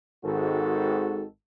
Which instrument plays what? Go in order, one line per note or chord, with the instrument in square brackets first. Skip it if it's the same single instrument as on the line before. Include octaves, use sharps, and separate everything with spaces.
[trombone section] G#1 G#2 D#3 F#4 A4